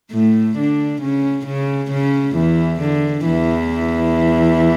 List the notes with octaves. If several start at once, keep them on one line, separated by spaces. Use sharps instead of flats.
A2 A3
D3 D4
C#3 C#4
C#3 C#4
C#3 C#4
E2 E3
D3
E2 E3